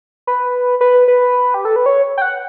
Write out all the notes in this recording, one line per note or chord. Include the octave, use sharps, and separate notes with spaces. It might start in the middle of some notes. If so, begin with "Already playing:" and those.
B4
B4
B4
G4
A4
B4
C#5
G5
F#5